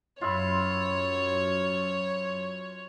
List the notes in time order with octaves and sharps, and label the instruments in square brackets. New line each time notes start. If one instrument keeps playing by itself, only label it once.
[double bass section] F#2 [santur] F4 E5 B5 [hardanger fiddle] C#5